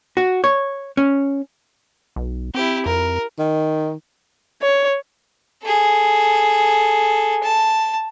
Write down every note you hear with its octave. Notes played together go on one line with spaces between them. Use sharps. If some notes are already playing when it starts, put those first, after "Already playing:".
F#4
C#5
C#4
B1
C4 E4 G4
F2 A#4
D#3
C#5
G#4 A4
A5